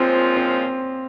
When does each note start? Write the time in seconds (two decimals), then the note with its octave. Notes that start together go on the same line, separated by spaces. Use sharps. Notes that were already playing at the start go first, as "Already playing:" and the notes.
Already playing: A#2 F3 G#3 C4 C#4 F4
0.37 C4